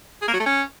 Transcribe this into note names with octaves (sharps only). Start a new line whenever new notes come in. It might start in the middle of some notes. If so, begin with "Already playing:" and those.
G#4
A#3
F#3
A3
C#4